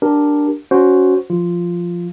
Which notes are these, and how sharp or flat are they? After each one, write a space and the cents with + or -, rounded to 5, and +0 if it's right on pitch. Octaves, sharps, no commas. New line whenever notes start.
D4 +0 G4 +0 A#4 +0
C#4 +15 F#4 +0 C5 +0
F3 +0 F4 -5